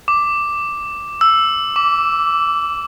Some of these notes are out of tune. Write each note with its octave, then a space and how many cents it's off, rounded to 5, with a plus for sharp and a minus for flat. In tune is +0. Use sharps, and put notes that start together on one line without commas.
D6 +0
E6 +5
D6 -20